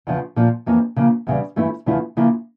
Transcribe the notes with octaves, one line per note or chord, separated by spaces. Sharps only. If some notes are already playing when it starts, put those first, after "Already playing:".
E2 C#3 F3
A#2 F3 A#3
F2 E3 A#3 C#4
C#3 F3 A#3
E2 C#3 G3
G2 E3 A3 C#4 E4
E2 C#3 F3 A3 E4
C#3 F3 A#3 E4